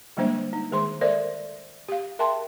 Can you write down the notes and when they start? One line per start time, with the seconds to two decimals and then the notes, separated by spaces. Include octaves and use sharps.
0.17 D3 G3 G#3 A#3 D4 C5
0.53 D#4
0.71 D#3 G#3 G#4 C5 C6
1.01 A4 A#4 C5 D5 E5
1.88 G4 F5
2.19 G#4 A#4 E5 G5 A5 C6